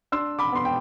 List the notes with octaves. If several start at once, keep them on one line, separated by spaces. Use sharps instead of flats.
D4 C6 E6
B5 D6
B3 C6
G5